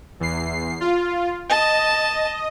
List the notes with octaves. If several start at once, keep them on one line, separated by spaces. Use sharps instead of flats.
E2 C7
F4
D#5 A5